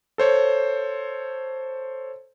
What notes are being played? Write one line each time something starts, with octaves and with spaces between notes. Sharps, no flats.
A4 C5 C#5